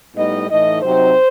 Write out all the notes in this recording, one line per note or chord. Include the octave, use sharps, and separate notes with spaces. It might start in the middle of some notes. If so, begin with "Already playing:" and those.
A2 G3 B3 D#4 D#5
A2 E3 A3 D#4 D#5
C3 F#3 C4 D#4 C5